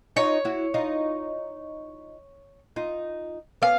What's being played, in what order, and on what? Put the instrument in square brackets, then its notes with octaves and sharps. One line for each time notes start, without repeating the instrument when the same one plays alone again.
[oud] D#4 F4 [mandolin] C#5
[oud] E4 F#4
D#4 F4
D#4 F4
[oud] B3 C#4 [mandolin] F5